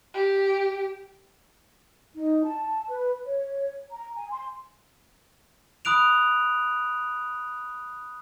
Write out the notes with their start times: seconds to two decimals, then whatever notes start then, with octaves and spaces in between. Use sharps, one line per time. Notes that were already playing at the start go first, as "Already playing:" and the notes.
0.14 G4
2.16 D#4
2.43 A5
2.87 B4
3.24 C#5
3.91 A#5
4.16 G#5
4.30 C6
5.85 B5 D#6 F#6 D7 F7